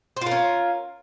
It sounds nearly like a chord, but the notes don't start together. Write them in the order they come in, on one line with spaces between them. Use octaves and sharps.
C5 F4 A#4 C#4